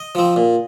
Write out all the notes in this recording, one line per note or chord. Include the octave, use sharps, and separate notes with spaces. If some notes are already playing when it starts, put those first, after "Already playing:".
Already playing: D#5
F3 C4
A#2